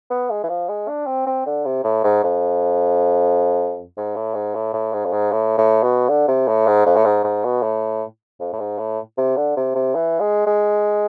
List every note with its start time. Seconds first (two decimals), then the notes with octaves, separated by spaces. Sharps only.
0.11 B3
0.30 G#3
0.44 E3
0.49 F3
0.69 G#3
0.88 D4
1.07 C4
1.27 C4
1.46 D3
1.65 C3
1.84 A2
2.04 G#2
2.24 F2
3.97 G#2
4.16 A2
4.35 G#2
4.55 A2
4.73 A2
4.93 G#2
5.06 F2
5.13 G#2
5.32 A2
5.58 A2
5.83 B2
6.09 D3
6.28 C3
6.48 A2
6.67 G#2
6.86 F2
6.96 A2
7.05 G#2
7.24 G#2
7.44 B2
7.63 A2
8.40 F2
8.53 A2
8.60 G#2
8.79 A2
9.18 C3
9.37 D3
9.57 C3
9.75 C3
9.95 E3
10.20 G#3
10.47 G#3